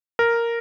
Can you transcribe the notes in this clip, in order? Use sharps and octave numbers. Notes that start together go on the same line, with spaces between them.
A#4